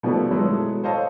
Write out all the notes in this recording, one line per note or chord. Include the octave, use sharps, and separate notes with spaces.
B2 D#3 F3 G3 A3 B3
F#3 G#3 A3 B3 E4 A4
A4 C5 C#5 D#5 F5 A5